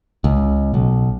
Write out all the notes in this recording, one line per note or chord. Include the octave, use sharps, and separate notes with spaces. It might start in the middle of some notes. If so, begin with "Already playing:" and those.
C#2
B1